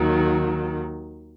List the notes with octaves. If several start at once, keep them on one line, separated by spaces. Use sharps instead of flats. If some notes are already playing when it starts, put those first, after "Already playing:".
Already playing: D#2 D#3 F#3